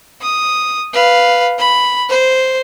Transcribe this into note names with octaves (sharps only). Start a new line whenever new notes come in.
D#6
B4 F5
B5
C5